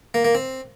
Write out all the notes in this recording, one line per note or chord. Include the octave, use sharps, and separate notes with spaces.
A#3
A#3
C4